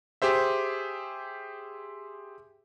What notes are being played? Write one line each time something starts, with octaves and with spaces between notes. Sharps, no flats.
G4 G#4 C5 E5